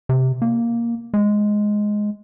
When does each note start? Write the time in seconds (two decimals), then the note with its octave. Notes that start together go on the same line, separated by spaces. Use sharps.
0.09 C3
0.42 A#3
1.14 G#3